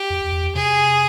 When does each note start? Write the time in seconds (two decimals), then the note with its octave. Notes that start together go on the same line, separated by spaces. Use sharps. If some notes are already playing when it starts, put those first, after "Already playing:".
Already playing: G4
0.10 F2
0.22 E2
0.32 E2
0.43 F2
0.55 C3 G#4